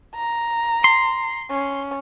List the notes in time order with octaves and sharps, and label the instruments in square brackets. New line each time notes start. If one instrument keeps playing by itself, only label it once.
[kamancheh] A#5
[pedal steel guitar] C6
[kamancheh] C#4